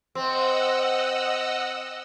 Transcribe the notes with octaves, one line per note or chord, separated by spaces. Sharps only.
C4 D#5 F#5 E6